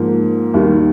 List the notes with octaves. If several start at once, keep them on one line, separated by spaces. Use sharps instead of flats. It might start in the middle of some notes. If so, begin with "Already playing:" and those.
Already playing: G#2 F3 A#3
D#2 D#3 G3 A#3